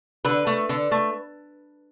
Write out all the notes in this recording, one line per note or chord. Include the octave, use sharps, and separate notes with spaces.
D3 B4
A3
D3
A3